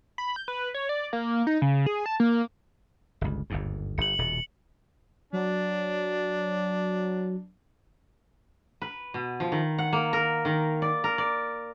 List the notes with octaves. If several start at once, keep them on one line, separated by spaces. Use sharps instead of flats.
B5
G6
B4
C#5
D5
A#3
D#4
C#3
G#4
A5
A#3
G1 C#2
G1 D#2 G#2
G1 C#7 F#7
D#1 B2
F#3 D4
B4
B2
F3
D#3
F#5
A#3
A#4
D#3
D5
A#4
D5